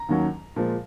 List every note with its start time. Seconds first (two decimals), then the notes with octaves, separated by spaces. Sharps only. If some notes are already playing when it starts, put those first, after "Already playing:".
Already playing: A#5
0.09 D#2 D#3 F#3 C#4
0.56 A#2 F3 G#3